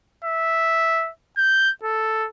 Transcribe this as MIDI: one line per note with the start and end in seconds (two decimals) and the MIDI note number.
0.24 1.10 76
1.38 1.71 91
1.84 2.27 69